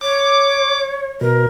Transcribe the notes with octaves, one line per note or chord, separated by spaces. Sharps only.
C#5 D6
B2 A#4